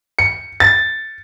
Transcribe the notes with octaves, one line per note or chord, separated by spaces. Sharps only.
C#7
A6